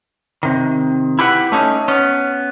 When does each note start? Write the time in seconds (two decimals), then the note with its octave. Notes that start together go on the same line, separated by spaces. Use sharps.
0.43 C3 D#3
1.19 E4 G4 B4 F#5
1.52 A3 C#4 D#4
1.88 B3 C#4